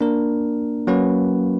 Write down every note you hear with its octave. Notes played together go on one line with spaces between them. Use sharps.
A#3 D4 A#4
F#3 A#3 C#4 F#4 B4